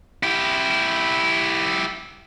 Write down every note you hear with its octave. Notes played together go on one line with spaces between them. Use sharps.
E4 G4